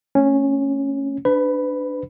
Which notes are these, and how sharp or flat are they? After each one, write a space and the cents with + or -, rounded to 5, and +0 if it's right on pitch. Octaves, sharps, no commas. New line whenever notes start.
A3 +30 C#4 -5
D4 +0 B4 +30 B5 +0